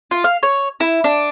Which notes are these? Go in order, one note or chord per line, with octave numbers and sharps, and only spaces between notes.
F4
F5
C#5
E4
D4